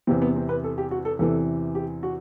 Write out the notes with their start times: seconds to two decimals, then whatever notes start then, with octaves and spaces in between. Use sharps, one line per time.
0.07 E2 C3 E3 C4
0.22 B3
0.36 C4
0.49 B4
0.64 A4
0.78 G4
0.91 F#4
1.05 A4
1.19 E2 C3 E3 A4
1.75 G4
2.03 F#4